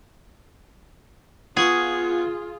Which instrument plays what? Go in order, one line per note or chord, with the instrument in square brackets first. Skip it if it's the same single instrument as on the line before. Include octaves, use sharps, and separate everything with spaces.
[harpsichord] B3 C#6 D#6 [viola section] F4 [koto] G#4